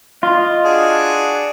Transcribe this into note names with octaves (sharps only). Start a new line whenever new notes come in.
F4 D#5
D4 F#4 G#4